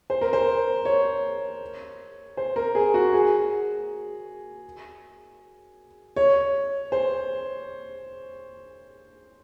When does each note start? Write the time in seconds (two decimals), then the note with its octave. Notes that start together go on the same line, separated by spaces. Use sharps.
0.10 C5
0.21 A#4
0.33 C5
0.85 C#5
2.37 C5
2.56 A#4
2.75 G#4
2.94 F#4
3.13 G#4
6.16 C#5
6.92 C5